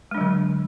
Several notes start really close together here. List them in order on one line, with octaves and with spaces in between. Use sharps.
G#3 D4 F#3 D3